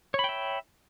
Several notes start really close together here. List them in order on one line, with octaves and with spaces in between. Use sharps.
C#5 B5 G5 E5